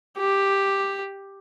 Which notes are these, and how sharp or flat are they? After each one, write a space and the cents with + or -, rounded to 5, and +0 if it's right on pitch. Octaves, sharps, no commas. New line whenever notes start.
G4 +5